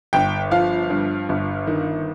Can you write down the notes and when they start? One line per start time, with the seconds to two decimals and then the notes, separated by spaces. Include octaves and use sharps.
0.13 G1 G5
0.51 F3 F5
0.90 G2
1.29 G1
1.67 D#3